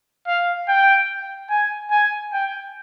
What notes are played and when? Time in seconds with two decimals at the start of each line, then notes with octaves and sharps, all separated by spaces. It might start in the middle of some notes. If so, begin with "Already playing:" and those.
0.27 F5
0.68 G5
1.50 G#5
1.91 G#5
2.33 G5